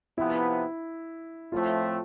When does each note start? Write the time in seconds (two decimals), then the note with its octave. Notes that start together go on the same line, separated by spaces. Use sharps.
0.18 C3 F3 B3 E4
1.52 A2 F3 A3 C4 F4